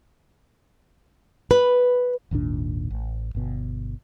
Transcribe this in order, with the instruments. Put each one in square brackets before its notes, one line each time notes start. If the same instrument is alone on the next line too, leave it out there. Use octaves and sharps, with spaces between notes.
[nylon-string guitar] B4
[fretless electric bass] G#1 D#2 A#2 D4
A1
G1 B2